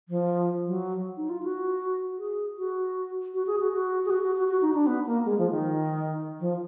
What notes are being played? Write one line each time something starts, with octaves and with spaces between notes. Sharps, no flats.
F3
F#3
D#4
F4
F#4
G#4
F#4
F#4
G#4
F#4
F#4
G#4
F#4
F#4
F#4
F#4
D#4
D4
B3
A#3
G#3
F3
D#3
F3